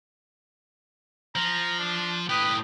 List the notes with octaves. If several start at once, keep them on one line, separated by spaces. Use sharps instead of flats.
F3 A#5
D4
A2 G4 B4 D#6